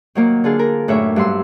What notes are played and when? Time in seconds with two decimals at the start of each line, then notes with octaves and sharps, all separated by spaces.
0.15 D#3 F#3 A#3
0.44 D3 F4 G#4
0.59 A#4
0.88 F#2 A2 D4 C#5 E5
1.16 G2 F#3 C6 E6